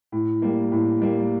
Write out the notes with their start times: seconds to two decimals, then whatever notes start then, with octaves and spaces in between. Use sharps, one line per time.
0.12 A2
0.42 G3 A#3
0.72 A2
1.02 G3 A#3